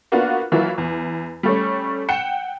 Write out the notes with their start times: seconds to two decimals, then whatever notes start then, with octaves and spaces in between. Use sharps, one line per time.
0.12 A#3 B3 D4 F4 F#4
0.52 E3 F#3 A#3 E4 F4
0.78 E2
1.43 G3 A3 C#4
2.09 F#5 G5 C#7 E7